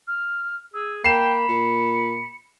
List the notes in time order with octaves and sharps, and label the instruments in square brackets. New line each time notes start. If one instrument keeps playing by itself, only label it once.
[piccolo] F6
[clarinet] G#4 [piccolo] E6
[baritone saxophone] A#3 [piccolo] G5 [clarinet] B5 [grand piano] C7 E7
[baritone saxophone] A#2 [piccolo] C#7